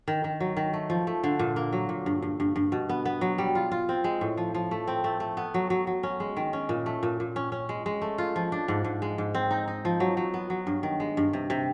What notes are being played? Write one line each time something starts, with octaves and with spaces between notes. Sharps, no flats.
D#3
D#3
F#3
D#3
A3
F3
A3
D3
A#2
A#3
F#3
A#2
G2
G2
G2
G2
B2
B3
B3
F#3
G3
F4
F4
C4
G#3
A2
F3
F3
A3
C4
A3
A3
B3
F#3
F#3
F#3
C#4
G#3
D#3
C#4
A#2
A3
A#2
A#2
C#4
C#4
G#3
G#3
A3
F4
F3
D4
G#2
G#2
G#3
G#2
C4
D#4
D#4
F3
F#3
F#3
B3
F#3
G2
D#3
G#3
G2
C3
C3